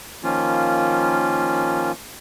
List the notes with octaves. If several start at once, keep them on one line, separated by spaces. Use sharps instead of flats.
D#3 F3 A#3 C#4 F4